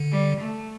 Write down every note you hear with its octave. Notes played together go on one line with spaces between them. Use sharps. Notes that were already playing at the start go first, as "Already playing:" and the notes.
Already playing: D3
G3
A3